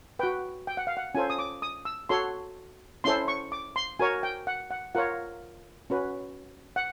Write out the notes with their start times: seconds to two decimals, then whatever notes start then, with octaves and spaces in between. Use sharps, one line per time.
0.19 F#4 B4 G5
0.67 G5
0.77 F#5
0.87 F5
0.97 F#5
1.15 C#4 F4 A4 C5 G#5
1.30 D#6
1.39 D6
1.62 D#6
1.85 E6
2.09 F#4 A4 C#5 C6
3.04 C#4 E4 A4 C5 C6
3.28 C#6
3.52 D6
3.76 C6
3.99 F#4 A#4 C#5 G#5
4.23 G5
4.47 F#5
4.71 F#5
4.95 F4 A#4 C#5 F#5
5.90 C#4 F#4 B4
6.76 F#5